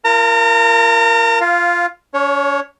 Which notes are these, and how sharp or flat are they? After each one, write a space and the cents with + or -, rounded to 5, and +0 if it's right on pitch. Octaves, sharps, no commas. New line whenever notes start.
F4 -35 A#4 +0 A#5 -40
F4 -10 F5 +5
C#4 +40 C#5 +0